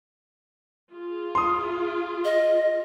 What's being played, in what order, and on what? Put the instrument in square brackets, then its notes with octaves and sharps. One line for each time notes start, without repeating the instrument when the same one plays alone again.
[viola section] F4 G#4
[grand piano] C6 D#6
[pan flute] D#5